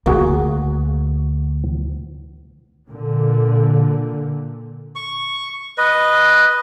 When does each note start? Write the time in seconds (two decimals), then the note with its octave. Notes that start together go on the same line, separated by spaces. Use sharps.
0.06 D2 A#3 F#4 G#4
2.88 A#2 D3
4.95 C#6
5.78 B4 D#5